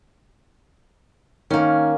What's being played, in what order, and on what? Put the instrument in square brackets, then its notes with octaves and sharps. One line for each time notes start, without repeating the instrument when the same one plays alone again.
[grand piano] D#3 [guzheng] A#3 C#4